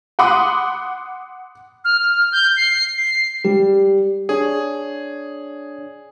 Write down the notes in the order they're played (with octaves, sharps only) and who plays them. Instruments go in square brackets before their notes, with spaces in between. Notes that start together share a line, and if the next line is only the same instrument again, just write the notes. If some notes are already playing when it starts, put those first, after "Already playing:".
[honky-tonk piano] F#5 B5 C6 D6 D#6 F#6
[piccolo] F6
F6
G6
C7
C7
[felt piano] G3
[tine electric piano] D4 C#5 D5 [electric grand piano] G#4